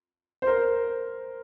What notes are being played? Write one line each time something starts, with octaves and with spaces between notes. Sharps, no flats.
C5
A#4